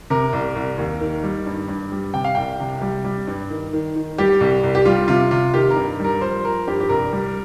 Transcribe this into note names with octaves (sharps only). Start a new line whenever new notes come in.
C3 A#4
C2
C2
D#2
D#3
G3
G2
G2
G3
C3 G5
F5
C2 G5
C3
G3
G3
G2
D#3
D#3
D#3
G3 G4
C2
C2
G4
G3 F4
C3 F4
C3 F4
D#3 G4
A#4
G2
G3 A#4
F3 C5
F3 A#4
G2 G4
G4
C2 A#4
G3